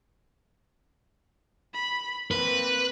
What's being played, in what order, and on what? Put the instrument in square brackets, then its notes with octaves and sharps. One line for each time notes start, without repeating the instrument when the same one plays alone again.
[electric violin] B5
[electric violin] A#3 C4 [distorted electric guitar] B4